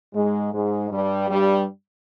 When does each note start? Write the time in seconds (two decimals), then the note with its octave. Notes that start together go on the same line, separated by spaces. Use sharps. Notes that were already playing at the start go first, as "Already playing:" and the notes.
0.14 G#2 G#3
0.52 G#2 G#3
0.90 G2 G3
1.29 G2 G3